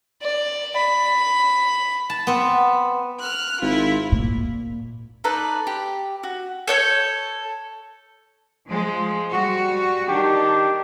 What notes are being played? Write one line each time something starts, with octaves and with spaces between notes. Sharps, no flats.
D5
B5
A5
B3 C4
F6 F#6
G#1 E4 F4
A#2
D#4 A4 B4 D5
G4
F#4
A4 C#5 G6
F3 G#3
G3 F#4
D#3 D4 G4